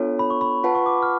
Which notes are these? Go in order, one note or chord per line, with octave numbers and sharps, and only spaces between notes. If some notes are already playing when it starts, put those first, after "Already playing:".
Already playing: B3 D4 F4 A4 C#5
B5
C#6
B5
F4 B4 F#5 A5
C#6
D6
F6